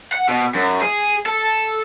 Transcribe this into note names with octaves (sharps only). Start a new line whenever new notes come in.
F#5
B2
F#2
G#4
A4